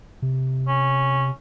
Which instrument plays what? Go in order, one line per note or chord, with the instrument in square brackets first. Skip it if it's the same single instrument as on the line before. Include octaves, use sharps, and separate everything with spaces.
[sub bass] C3
[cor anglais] C#4